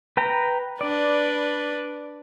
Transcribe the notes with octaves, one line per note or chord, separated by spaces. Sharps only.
B4 G5 A#5
D4 B4 D5